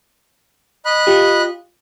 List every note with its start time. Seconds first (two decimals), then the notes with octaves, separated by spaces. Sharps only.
0.85 D#5 B5 F#6
1.07 F4 G4